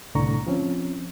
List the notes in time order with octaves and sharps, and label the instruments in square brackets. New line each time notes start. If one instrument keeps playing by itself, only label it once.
[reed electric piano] C2 A2 D3 A#5 C#6
F3 C4 C#4